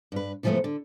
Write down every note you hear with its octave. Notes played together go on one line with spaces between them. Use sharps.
G2 B4
C3 E3 F3 G#3 A3 B3
D3